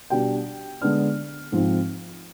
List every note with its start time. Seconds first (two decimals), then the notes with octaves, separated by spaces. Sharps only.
0.10 B2 G3 D4 G5
0.81 D3 G#3 B3 D4 F6
1.52 G#2 F3 C4